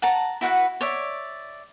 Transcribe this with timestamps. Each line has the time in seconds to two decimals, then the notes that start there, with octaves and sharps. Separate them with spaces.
0.02 F#5 A5 A#5
0.41 E4 F#4 B4 F#5
0.81 C#5 D5 E5